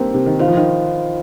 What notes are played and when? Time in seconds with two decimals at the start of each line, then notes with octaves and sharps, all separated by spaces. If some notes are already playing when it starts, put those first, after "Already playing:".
Already playing: G3 A#3 C4 D#4 C5 G5
0.14 C3
0.26 D#3
0.39 D#3 F4 C5 F5
0.48 F3
0.57 D#3